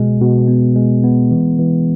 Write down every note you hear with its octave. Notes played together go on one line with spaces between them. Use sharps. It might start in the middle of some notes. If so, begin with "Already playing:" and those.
Already playing: B2 G#3
B2
B3
G#3
B3
E3
E3